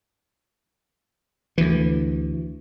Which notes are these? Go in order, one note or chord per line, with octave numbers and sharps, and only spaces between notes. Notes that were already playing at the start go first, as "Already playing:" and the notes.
D2 E3